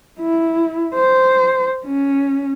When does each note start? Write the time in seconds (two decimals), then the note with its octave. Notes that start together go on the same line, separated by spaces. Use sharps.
0.20 E4
0.94 C5
1.85 C#4